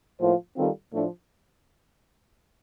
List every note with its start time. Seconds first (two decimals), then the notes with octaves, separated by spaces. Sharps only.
0.20 A2 F3 A#3 F4 C5
0.56 D#3 G3 C4 F4 A4
0.92 A2 F3 A3 D4